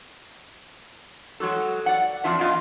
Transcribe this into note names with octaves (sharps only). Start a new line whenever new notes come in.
F#3 G#3 F#4 A4
D5 F#5
F2 D4 F4 E5
E2 B3 F4 D#5 F5